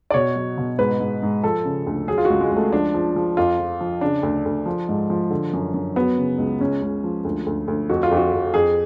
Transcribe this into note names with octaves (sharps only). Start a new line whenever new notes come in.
D5
B2 C#5
F#3
B2
G#2 B4
G#2
G#2
F3 A4
C#3
D2
F#3 G#4
F4
F#4
C#2
G#3
C#2
A3
F3 D4
F3
F3
F2 F4
F3
F3
C#3 D4
D2
D2
F3
G#2
F3
D3
F#2
F#2
F#3 B3
C#3
C#2
C#2 C#4
C#2
F3
D2
D2
D2
F2 F#4
F4
F2
F#4
F2
F2 G#4